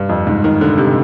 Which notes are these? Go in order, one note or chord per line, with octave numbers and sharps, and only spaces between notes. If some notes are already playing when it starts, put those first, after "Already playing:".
Already playing: G2
F2
G#2
D#3
D3
C3